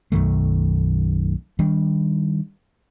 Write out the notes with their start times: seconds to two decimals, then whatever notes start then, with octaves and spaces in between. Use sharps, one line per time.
0.12 B1 F#2 D#3 A3
1.59 D#3 G3 D4